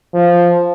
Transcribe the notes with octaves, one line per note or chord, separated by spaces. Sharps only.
F3